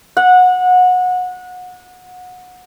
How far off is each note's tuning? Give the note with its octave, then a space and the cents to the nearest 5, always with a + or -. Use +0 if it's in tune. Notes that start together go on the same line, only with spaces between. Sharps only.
F#5 -25